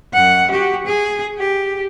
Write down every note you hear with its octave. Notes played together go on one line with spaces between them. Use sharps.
F#2 F#5
F#4 G4
G#4
G4